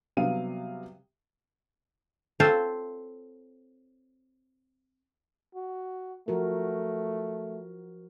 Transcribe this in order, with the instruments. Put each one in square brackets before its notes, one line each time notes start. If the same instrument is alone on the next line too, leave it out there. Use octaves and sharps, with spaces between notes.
[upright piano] C3 F#3 G3 B3 F5 D#7
[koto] C4 F4 A4 C5 C#5
[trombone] F#4
[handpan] F3 F#4 A#4 [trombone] A3